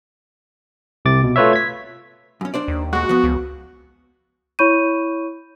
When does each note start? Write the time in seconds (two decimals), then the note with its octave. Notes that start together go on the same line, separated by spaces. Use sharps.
1.05 C2 C3 D6 A6
1.24 B2
1.36 A3 F4 B4 C#5 E5
1.53 G#6 B6
2.41 F#2 C#4
2.54 D4 C5 D5
2.68 D#2
2.93 A#2 G#3 F#4
3.09 F3 B3
3.24 C#2
4.59 E4 C#5 B5 C#6 G6 D#7